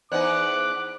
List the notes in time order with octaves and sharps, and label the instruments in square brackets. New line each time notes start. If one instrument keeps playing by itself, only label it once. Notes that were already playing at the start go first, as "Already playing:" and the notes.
[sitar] E2 B3 D#4 [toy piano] C5 D5 [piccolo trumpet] D6 [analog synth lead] F#6